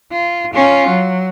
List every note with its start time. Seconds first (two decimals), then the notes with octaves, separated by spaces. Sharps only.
0.12 F4
0.54 C#4 F4
0.88 F#3